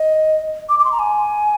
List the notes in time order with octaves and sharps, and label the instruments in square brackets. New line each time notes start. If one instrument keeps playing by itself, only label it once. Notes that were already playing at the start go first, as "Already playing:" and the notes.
Already playing: [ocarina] D#5
D6
D6
C6
A#5
G#5